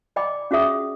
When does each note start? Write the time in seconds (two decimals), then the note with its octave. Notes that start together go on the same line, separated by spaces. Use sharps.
0.16 D5 D#5 G5 B5 D6
0.51 C#4 F#4 G#4 E5 D#6